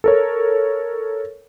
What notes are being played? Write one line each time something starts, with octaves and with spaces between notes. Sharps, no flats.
A4 A#4 C#5